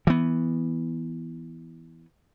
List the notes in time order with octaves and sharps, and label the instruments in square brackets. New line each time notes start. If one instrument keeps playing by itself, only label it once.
[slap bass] E3 B3